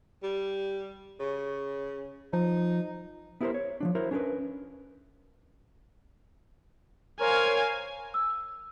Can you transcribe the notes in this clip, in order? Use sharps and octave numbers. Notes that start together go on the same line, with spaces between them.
G3
C#3
F3 D#4
B3 E4 G4 A4 A#4 C5
C#5
F3 F#3 D4
E4 F#4 A#4 C5
C#4 D4 G4 A#4 B4
A#4 C5 C#5 F5 G#5
E6